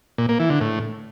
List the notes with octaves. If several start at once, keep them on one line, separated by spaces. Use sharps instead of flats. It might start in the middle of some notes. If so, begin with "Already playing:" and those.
A#2
A#3
E3
D3
A2